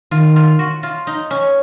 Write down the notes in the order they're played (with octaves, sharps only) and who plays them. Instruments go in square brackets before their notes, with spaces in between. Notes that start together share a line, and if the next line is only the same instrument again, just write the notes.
[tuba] D#3 [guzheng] F4
[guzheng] F4
F#4
F4
D#4
C#4